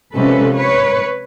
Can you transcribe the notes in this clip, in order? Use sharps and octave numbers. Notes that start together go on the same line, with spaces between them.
C3 F3 G#3 C#4 A4 B4
B4 C#5